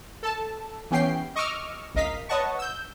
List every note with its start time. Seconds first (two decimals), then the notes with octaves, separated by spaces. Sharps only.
0.23 A4 A5
0.91 E3 B3 C#4 G4 G5 C7
1.36 D#5 C#6 D6 E6 F6
1.94 G#1 C#2 A#4 D#5 F5 B6
2.29 B4 C#5 D#5 F#5 A5 C#6
2.59 E6 G6